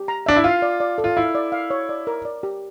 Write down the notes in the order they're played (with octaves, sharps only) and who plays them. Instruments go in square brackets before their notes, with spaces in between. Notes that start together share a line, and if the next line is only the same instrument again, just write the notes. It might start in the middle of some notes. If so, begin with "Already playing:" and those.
Already playing: [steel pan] G4
A#5
[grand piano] D4 [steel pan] E5
[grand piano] E4
[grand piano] F4 [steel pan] F5
[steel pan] D5
D5
A4
[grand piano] F4
[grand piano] E4 [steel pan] F5
[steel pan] D5
F5
C#5
D5
A#4
D5
G4